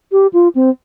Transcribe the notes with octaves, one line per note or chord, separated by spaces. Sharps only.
G4
F4
C4